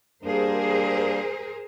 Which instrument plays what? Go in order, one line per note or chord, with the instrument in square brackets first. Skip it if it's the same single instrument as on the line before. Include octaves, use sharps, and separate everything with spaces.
[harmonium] G3 A#3 D4 [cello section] G#4 A#4 C5